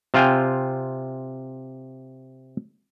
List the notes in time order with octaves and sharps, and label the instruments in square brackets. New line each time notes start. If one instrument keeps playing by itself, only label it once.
[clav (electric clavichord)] C3 F4 F5 G5 G#5